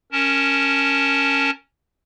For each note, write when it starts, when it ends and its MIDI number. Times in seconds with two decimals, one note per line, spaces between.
0.12 1.50 61
0.12 1.50 70
0.12 1.50 81